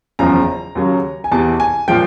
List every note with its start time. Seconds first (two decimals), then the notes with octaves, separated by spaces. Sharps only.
0.19 F#1 E2 C#3 F3 A#5
0.75 D#2 C#3 F#3
1.24 G#5
1.32 E2 C3 E3 A5
1.60 G#5
1.88 A#2 F3 G#3 G5